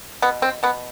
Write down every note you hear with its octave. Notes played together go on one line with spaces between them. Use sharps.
B2 B3
C4
B2 B3